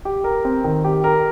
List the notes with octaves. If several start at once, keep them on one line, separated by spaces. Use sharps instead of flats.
G4
A#4
C4
D#3
G4
A#4